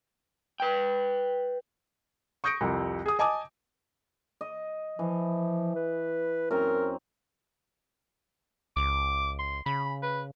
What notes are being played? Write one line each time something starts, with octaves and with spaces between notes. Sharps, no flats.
B4 G5
C#6 D#6 G6 A#6 C#7 D7
C2 F2 C3
G#4 D#6
D#5 G#5 A5 D6 D#6
D#5
E3 F3
B4
F#2 C4 A#4 A#5
C#2 D6
C6
C#3 B5
B4